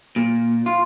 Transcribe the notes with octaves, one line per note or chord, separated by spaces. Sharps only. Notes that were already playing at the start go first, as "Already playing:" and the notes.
A#2
F4